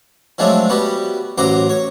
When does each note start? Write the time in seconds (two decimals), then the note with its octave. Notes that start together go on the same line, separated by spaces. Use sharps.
0.38 F3 F#3 G#3 A3 C4 D4
0.69 G3 B3 F#4 G4
1.38 A1 F#3 F#4 C5 A#5 D6
1.69 C#5